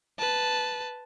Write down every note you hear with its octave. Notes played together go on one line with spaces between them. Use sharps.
B4 A5